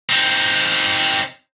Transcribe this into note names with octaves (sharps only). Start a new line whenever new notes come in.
C4 D#4